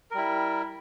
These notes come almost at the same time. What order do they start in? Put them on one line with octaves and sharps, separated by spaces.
A#4 G3 E4